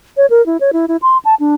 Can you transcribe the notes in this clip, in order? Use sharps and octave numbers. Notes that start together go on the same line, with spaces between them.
C#5
A#4
E4
C#5
E4
E4
C6
A5
D4